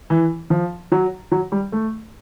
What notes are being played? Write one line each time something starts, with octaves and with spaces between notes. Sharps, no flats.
E3
F3
F#3
F#3
G3
A3